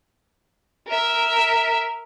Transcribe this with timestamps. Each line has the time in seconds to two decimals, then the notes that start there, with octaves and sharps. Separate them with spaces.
0.87 A#4 E5